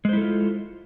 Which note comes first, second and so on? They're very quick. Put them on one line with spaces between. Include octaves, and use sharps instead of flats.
G#3 C5 E4 A4 F4